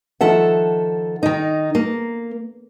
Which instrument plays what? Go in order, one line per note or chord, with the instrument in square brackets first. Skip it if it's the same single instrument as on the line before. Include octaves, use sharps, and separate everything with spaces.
[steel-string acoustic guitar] D#3 F3 A4 E5 F#5
D#3 D#4
A#3